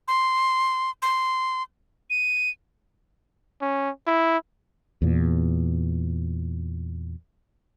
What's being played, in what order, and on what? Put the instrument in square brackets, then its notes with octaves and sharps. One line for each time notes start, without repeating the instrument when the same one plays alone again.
[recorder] C6
C6
[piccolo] D#7
[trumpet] C#4
E4
[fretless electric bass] E2 A#2